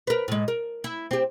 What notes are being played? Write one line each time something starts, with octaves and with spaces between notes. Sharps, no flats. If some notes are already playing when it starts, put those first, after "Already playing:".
A#4 B4
A2 G#3
A#4
E4
C4 G4